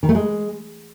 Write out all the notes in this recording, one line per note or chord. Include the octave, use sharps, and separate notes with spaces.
D#3
A3
G#3